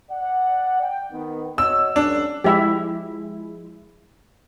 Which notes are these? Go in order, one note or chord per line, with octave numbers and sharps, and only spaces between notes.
D5 F#5
G5
D#3 B3
F#4 C#5 D#5 E6
C#2 F#2 C#3 D4
F3 G#3 E4 G4 E5